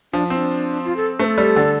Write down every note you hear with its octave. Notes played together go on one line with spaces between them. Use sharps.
F3 D4
C4 F4
D4
F4
A4
A3 A4 C5
G3
D3